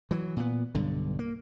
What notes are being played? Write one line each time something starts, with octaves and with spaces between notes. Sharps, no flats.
E3 F#3
A#2 B3
B1 G2 D3
A#3